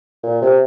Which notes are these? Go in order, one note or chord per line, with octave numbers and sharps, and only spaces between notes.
A#2
C3